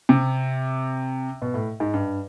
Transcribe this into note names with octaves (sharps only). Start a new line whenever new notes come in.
C3
B2
A2
G#2
G2